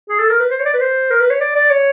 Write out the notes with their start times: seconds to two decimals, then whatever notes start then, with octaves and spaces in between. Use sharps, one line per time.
0.09 G#4
0.19 A4
0.30 A#4
0.40 B4
0.51 C5
0.60 C#5
0.65 D5
0.74 B4
0.81 C5
1.10 A#4
1.21 B4
1.30 C#5
1.40 D5
1.56 D5
1.70 C#5